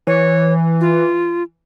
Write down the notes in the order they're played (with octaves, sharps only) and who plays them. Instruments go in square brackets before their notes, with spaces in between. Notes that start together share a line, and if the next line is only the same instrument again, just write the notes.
[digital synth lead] E3 [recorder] C#5
[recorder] F4